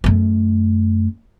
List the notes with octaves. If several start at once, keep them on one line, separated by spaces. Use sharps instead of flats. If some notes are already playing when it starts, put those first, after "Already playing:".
F#2 A3